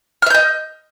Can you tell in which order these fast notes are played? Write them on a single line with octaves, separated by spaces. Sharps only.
F6 E5 G6 D#5